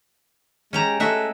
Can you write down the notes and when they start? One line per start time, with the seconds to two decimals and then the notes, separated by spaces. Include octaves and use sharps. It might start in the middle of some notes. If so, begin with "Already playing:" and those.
0.73 G#3 C#4 G4 A#5
1.00 G#3 A3 F#4 E5